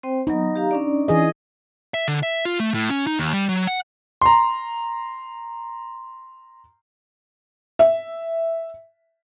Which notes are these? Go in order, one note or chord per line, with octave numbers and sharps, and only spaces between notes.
C4 C5 G5
F#3 B3 D#4
G4 F5 A#5
C#4 D4 D5
E3 G#4 D#5
E5
D3
E5
F4
A3
A2
C#4
D#4
D#2
G3
F#3
F#5
A#5 C6
E5